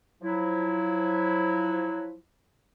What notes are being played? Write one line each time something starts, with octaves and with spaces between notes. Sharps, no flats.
F3 F#3 E4